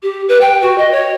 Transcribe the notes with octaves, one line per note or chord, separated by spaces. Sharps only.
G4
B4
G5
F#4
D#5
C#5